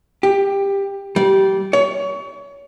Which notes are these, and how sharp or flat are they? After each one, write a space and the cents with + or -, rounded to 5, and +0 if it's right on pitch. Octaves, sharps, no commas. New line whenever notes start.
G4 +15
G3 -20
C#5 +30